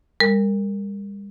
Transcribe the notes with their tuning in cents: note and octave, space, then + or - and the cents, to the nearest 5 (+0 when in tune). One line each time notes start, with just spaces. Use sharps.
G3 +40 A#4 -15